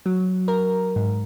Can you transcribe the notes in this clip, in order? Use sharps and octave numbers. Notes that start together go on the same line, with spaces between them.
F#3
A#4
G#2